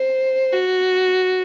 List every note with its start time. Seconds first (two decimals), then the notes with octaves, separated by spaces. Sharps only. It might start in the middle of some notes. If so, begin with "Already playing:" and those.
Already playing: C5
0.53 F#4